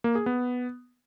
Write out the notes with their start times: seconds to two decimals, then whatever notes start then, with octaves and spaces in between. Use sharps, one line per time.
0.04 A#3
0.15 G#4
0.26 B3